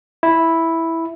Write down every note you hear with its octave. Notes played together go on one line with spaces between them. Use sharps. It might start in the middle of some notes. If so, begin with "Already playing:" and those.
E4